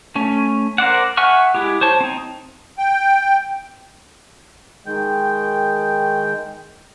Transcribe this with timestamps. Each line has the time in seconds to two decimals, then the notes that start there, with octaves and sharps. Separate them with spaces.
0.15 A3 C#4
0.78 A#4 C5 D5 F#5
1.17 E5 F#5 G#5 C#6 F6
1.55 G#3 E4 G4
1.81 C5 C#5 A5
2.01 C4 D#4
2.78 G5
4.86 D#3 G#3 G5